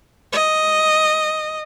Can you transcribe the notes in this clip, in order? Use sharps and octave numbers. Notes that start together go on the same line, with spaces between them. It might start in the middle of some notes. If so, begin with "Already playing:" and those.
D#5